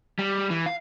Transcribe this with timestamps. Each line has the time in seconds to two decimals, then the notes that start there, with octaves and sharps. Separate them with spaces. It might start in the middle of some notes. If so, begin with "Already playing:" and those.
0.19 G3
0.50 E3
0.66 F5